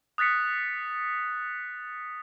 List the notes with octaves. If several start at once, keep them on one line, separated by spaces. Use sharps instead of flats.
D#6 F#6 A6 B6 C#7